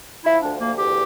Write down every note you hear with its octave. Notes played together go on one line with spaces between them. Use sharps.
F3 E4
D2 D4
D2 A#3
E2 G4